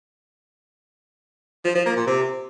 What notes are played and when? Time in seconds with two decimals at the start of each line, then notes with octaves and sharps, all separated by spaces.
1.65 F3
1.75 F3
1.86 A#3
1.96 A#2
2.07 C3